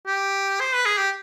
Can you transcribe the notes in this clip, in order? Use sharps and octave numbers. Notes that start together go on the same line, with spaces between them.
G4
C5
B4
G#4
G4